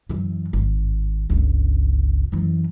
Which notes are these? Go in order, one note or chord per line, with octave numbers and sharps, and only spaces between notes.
F#2 E3
G#1
G1 C#2
F#2 E3